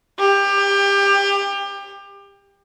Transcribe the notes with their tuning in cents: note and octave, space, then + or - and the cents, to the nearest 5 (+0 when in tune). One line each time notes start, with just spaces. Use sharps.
G4 +25